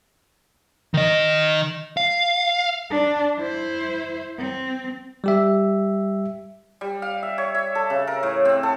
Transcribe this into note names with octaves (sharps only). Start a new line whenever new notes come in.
D#3 D#5
F5
D4
E4 C5
C4
G3 G4 E5
G3
F5
E5
C#5
E5
A4
C#3
A#4
A2
C4
A4